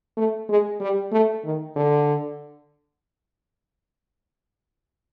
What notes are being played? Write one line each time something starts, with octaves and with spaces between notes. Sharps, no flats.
A3
G#3
G3
A3
D#3
D3